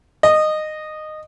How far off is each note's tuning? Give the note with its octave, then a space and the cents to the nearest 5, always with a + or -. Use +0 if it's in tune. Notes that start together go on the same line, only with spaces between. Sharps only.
D#5 -15